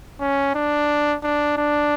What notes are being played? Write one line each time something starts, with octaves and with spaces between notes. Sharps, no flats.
C#4
D4
D4
D4